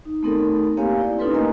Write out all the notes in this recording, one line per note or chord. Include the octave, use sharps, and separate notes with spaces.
D#4
A3 B3 C4 D#4 A4 A#4
A#3 C4 G4 C#5 F5 G#5
E4 D5
C#4 D#4 F4 A4 B4 C6
A3 A#3 A#4 D#5 G#5 A#5